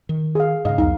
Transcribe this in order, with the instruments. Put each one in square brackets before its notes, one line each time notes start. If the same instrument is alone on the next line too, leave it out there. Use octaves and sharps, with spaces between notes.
[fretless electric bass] D#3
[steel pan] G#4 F5
[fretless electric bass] G#2 C#3 [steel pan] D#5 F5
[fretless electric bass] B1 E2 [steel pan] D#4 F5